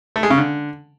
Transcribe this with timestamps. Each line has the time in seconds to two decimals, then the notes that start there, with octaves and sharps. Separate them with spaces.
0.16 A3
0.23 G#3
0.30 C#3
0.38 D3